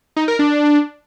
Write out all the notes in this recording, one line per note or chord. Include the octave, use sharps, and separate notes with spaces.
D#4
A#4
D4